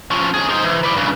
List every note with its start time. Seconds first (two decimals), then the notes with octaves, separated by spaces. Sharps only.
0.11 F3 C#4
0.34 D#2 G#4
0.49 D#4 C5
0.64 E3
0.83 B4 D5
0.96 G2 C#3